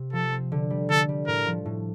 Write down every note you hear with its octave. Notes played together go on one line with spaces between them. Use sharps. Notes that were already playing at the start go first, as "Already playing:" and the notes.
Already playing: C3
F3 A4
C4
D3
G3
D3 A4
G3
A2 A#4
F3
A2